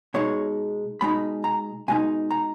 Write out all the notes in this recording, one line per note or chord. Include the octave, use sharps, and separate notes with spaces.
B2 G#3 D#4 C#5
B2 G#3 D#4 B5
A#5
B2 G#3 D#4 G#5
A#5